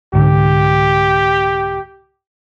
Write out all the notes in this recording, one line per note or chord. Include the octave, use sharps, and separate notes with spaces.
C2 G#2 D3 G4